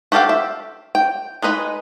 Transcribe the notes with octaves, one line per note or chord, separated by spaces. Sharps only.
F#4 G4 A4 F5 G5
E5
G5
G#3 D#4 B4 D#5